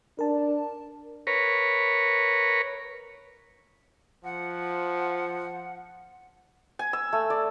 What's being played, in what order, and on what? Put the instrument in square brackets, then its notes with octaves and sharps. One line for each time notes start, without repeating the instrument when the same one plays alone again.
[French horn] D4 [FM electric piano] A#4 A5
[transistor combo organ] A#4 B4 C#5
[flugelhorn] F3 [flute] F#5
[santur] G#5
E6
A3
D5